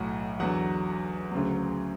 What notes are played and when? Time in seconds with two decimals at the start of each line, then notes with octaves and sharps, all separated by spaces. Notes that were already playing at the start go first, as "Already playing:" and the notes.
Already playing: B1 A2 F#3 F#5
0.40 E2 D3 F#3 F#5
1.32 D2 C#3 F#3